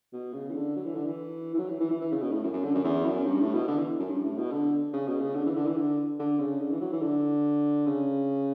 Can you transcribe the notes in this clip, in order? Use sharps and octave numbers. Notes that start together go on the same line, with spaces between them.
B2
C#3
E3
D3
F#3
E3
D3
E3
E3
F#3
E3
E3
E3
E3
C#3
B2
A2
F#2
F#2
D3
F#2
E2
F#2
G2
A2
B2
D3
E3
F#2
G2
A2
B2
D3
C#3
B2
C#3
D3
E3
D3
E3
D3
D3
C#3
D3
E3
F#3
E3
D3
C#3